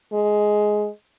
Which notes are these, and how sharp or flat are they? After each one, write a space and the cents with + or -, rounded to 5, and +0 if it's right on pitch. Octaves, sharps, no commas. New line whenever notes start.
G#3 +10